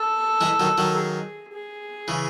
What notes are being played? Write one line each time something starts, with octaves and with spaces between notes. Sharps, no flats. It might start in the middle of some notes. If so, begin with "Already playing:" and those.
Already playing: A4
E3 G#3
D#3 F#3
D#3 F#3
G#4
G#4
C#3 E3